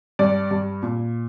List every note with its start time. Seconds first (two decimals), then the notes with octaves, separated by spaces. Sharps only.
0.19 G2 D5
0.51 G2
0.83 A#2